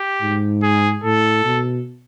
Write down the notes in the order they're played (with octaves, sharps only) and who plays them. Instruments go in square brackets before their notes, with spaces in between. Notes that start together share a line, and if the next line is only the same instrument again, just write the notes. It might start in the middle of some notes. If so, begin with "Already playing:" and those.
Already playing: [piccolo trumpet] G4
[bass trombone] G#2
[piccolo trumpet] G#4
[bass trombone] A2 [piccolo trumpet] A4
[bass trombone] B2